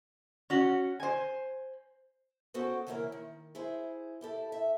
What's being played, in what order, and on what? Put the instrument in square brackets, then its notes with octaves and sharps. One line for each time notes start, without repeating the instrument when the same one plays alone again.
[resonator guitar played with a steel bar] C#4 F#4
C5 G#5
[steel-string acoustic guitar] B3 C#4 F#4 G4 A4 C5
C#3 E3 A#3 C4 E4 A#4
D#3
E4 G#4 C5
E4 G4 A4
E5